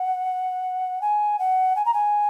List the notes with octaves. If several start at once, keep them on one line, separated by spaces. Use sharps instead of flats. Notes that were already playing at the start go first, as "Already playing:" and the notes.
Already playing: F#5
G#5
F#5
G#5
A#5
G#5